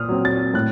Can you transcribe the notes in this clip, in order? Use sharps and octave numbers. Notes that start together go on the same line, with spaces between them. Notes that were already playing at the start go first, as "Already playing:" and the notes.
Already playing: A#2 D#6 F6
F#3 C4
A6
A2 F#6